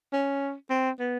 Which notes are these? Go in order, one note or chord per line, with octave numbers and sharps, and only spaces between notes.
C#4
C4
B3